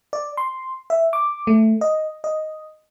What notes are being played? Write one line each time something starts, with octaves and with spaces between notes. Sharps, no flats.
D5
C6
E5
D6
A3
D#5
D#5